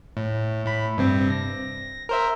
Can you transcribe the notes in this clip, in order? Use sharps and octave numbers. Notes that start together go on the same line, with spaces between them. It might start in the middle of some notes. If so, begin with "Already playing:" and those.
A2
A2 B5
G2 C3 C4
A#6
A#4 C5 E5